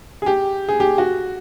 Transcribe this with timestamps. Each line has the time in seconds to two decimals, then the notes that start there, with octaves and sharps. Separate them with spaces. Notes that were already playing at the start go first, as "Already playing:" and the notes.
0.22 G#4
0.26 G4
0.68 G#4
0.80 G4
0.98 F#4